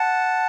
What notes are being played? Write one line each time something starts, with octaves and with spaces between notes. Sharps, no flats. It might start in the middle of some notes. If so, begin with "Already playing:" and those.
Already playing: F#5 A5